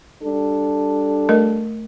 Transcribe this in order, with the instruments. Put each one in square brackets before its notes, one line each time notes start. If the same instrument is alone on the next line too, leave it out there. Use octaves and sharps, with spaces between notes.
[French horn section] G3 D4 A4
[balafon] A3 A#4 D#5